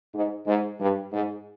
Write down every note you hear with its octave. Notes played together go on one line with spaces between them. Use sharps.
G#2
G#2
G2
G#2